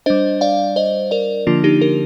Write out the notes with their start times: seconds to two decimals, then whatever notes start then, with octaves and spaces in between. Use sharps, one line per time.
0.06 G3 D4 C5 D#5
0.41 D5 F5
0.76 C5 D#5
1.11 A#4 D5
1.47 D3 F3 A#3 D4 F4
1.64 D#4 G4
1.81 G4 A#4